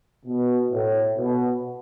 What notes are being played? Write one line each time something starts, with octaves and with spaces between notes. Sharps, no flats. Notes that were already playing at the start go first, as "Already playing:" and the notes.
B2
A2
B2